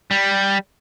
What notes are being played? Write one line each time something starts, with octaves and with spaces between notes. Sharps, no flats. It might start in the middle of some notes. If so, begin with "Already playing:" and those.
G3